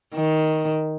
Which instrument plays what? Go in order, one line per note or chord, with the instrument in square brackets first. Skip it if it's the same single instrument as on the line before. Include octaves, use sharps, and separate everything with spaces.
[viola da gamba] D#3